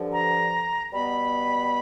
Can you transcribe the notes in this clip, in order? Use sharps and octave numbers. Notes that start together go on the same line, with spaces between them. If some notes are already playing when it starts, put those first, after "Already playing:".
Already playing: G2 D3 F3
A#5
B2 G3 B3 B5